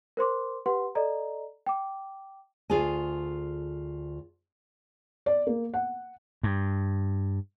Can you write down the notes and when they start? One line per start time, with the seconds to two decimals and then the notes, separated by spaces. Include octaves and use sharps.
0.17 A#4 C5 C6 D6
0.66 G4 B4 F#5 C6
0.95 A4 D5 D#5 A#5
1.66 G5 D6
2.70 D2 F4 G#4 D5 G#5
5.26 D5
5.47 A#3
5.74 F#5
6.43 G2